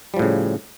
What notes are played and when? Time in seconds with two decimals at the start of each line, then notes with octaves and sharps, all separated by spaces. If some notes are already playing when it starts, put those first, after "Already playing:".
0.14 G3
0.17 F3
0.19 A2
0.22 C#3